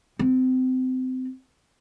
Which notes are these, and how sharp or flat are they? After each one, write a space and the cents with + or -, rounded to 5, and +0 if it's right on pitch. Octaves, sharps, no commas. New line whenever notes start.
C4 -30